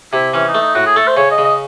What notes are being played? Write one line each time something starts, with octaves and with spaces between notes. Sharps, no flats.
C3 E4
E3 C#4
D#4
A3
D#4
A2 F#4
G#4
A3 A4
C5
C#3 C#5
D#5
C#3
D#5